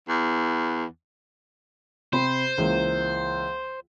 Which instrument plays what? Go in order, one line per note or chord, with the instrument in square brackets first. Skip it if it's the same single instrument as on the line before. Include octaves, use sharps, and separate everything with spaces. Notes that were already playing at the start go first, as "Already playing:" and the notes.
[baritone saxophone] E2
[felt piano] C3 C4 B5 [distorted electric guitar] C5
[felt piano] C#2 E3 A#3